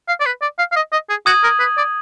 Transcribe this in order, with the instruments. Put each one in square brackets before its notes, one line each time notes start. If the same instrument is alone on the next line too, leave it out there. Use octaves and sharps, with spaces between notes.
[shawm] F5
D5
B4
D5
F5
F5
D#5
D#5
G#4
[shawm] F#4 [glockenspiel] D#6 G#6 D#7 F#7
[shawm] A#4
B4
D5